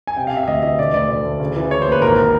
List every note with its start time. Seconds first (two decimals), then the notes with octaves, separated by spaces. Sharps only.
0.07 G#5
0.16 C3 G5
0.27 F5
0.32 C3 E5
0.43 E5
0.48 D2 D#5
0.63 E3 D#5
0.79 D3 D5
0.94 D2 D5
1.09 D3
1.25 D2
1.40 C#3
1.56 E3
1.71 E3 C#5
1.82 C5
1.86 D#2
1.92 B4
2.02 G#1 A#4